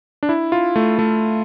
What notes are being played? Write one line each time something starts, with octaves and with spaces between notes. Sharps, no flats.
D4
E4
F4
A3
A3